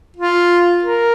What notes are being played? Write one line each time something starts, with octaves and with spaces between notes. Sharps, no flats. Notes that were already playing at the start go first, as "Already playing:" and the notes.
F4
A#4